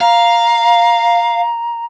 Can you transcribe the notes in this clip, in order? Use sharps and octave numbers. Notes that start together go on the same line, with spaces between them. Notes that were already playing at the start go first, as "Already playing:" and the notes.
F5 A#5